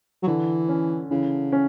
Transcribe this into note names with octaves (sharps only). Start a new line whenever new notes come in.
F#3
D3 E3
C#4
C#3 E3
C#4